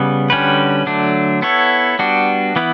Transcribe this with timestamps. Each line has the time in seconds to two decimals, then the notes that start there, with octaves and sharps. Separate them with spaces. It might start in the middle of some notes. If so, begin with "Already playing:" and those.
Already playing: C#3 G3 B3
0.30 D3 G3 C#4 F#4 B4
0.86 D3 F#3 A3 D4
1.42 B3 E4 A4 C#5
1.99 G3 B3 D4 F#4
2.56 E3 B3 E4